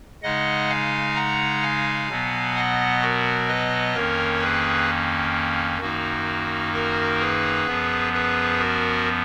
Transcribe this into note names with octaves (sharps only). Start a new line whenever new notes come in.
C#3 G#3 D#4 D#5 F#5
F5 G#5
F#5 A#5
F5 G#5
B2 F#3 B3
D#5 F#5
F#4 A#4
B4 D#5
F2 D#3 A#3 C#4 A#4 C#5
G#4 B4
F#2 D#3 A#3 D#4 F#4
F#4 A#4
G#4 B4
F#2 F3 B3
G#4 B4
F#4 A#4